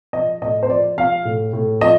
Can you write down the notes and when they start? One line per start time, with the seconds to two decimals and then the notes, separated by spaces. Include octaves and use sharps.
0.13 F3 D#5
0.42 A2 D#5
0.63 C5
0.69 F3 D5
0.97 F3 F5
1.25 A2
1.53 A2
1.81 F3 D#5